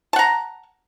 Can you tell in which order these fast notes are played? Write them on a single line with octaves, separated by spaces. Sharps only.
A5 F#5 A#5